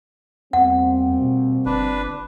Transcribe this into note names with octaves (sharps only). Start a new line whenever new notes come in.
E2 G3 A#3 C4 F#5
B2
G1 D4 B4